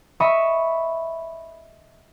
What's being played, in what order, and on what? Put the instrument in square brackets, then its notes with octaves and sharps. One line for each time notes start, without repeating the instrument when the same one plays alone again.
[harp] D#5 E5 B5 C#6